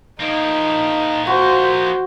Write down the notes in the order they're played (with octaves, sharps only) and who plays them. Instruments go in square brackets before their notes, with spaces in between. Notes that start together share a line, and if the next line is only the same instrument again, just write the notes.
[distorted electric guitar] F3 A#3 [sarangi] D#4
[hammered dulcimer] F#4 [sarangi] C5